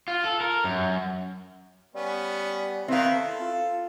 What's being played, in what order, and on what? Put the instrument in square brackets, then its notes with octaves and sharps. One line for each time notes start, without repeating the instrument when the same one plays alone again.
[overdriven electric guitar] F4
A4
A#4
F#2
[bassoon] G3 [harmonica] B3 C#4
[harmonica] D#3 B4 [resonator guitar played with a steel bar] C4 F5 [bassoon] E4
[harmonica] A4
[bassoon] F4